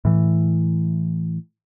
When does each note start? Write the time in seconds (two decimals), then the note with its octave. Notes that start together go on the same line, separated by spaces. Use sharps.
0.05 A2 E3